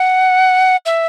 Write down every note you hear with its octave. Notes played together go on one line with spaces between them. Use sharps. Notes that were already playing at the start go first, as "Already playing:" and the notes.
Already playing: F#5
E5